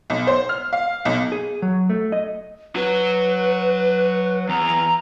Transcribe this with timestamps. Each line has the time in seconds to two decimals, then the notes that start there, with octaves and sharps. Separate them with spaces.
0.10 B1
0.27 C5
0.49 F6
0.73 F5
1.05 B1
1.32 G#4
1.62 F#3
1.89 A3
2.12 D#5
2.76 F#3 F#4 B4
4.49 E2 A#5